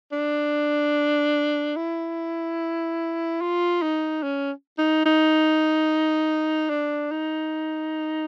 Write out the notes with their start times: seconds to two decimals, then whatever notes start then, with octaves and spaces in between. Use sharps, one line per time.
0.12 D4
1.76 E4
3.41 F4
3.82 D#4
4.23 C#4
4.78 D#4
5.05 D#4
6.70 D4
7.11 D#4